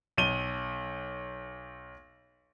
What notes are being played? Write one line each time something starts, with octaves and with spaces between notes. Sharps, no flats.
B1 D#7 G7